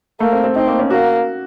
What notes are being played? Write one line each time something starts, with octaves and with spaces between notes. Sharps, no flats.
A3 A#3
C4
C4
C4 D#4
A#3
C#4
A#3 F#4